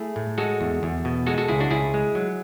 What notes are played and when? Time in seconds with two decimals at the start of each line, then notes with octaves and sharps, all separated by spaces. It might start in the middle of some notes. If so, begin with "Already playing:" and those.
Already playing: A3 E4 G#4
0.16 A2
0.38 G#3 F#4 A4
0.61 E2
0.83 E2
1.05 B2
1.26 G#3 F#4 A4
1.38 F#4 A4
1.48 C#2 E4 G#4
1.60 D4 F#4
1.71 C#2 E4 G#4
1.94 G#3
2.15 F#3